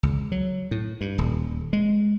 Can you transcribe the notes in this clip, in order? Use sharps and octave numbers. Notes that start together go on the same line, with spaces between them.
C#2
F#3
A2
G2
D#1
G#3